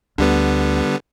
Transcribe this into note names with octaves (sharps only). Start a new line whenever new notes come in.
D2 D3 G3 B3